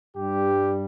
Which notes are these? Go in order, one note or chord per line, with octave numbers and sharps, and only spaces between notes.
G2 G3 G4